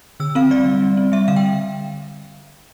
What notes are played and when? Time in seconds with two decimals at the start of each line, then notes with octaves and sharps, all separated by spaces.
0.20 D3 E6
0.35 C4 F5
0.50 G3 D5
0.66 G3
0.82 G3
0.97 C4
1.12 G3 E5
1.28 D3 F5
1.36 G5